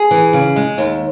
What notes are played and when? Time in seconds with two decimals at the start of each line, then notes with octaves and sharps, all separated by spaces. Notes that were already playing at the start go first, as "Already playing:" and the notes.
Already playing: G#4
0.11 E3
0.33 C#3
0.56 G#3
0.78 D#2